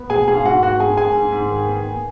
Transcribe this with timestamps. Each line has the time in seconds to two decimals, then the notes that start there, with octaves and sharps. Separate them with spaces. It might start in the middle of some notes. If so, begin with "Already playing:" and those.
Already playing: B3
0.10 B2 G#4 G#5
0.28 G#2 G#4 G#5
0.36 F5
0.45 G#2 F#4 F#5
0.63 A#3 F#4 F#5
0.80 G#2 G#4 G#5
0.97 G#2 G#4 G#5
1.15 G#2
1.32 G#2
1.50 D#3
1.67 B3
1.85 B3